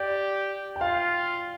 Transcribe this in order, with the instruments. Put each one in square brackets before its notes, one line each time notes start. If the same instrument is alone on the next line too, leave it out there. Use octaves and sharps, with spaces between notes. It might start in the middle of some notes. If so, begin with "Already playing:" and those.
Already playing: [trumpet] G4 [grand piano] D5
[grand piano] G5
[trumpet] F4 [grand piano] F5